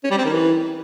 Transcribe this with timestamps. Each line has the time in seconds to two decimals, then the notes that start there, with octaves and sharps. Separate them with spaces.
0.04 C#4
0.11 G3
0.18 C4
0.25 D#3
0.32 E3